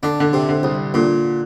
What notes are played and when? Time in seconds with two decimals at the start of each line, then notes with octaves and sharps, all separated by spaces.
0.03 D3 D4
0.20 D3
0.33 C3
0.49 D3
0.63 C2
0.94 A#2 D3